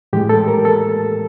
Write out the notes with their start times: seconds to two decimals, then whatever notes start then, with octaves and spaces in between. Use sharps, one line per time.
0.13 A2 E3 G#3 G4
0.29 A4
0.48 A#4
0.65 A4